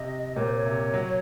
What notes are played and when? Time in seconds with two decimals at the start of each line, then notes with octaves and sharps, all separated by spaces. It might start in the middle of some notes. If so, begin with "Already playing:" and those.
Already playing: C3 D#5
0.36 A#2 C#5
0.46 C5
0.55 C#5
0.65 C3
0.94 F#3